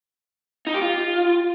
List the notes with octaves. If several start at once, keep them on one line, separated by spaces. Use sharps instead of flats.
D#4
G4
F4